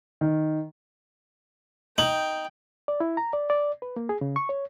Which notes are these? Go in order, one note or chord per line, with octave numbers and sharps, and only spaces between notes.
D#3
D#4 G5 F#7
D5
E4
A#5
D5
D5
B4
A#3
G#4
C#3
C#6
C#5